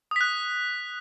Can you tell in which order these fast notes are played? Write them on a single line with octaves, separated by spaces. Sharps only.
D#6 B6 F#6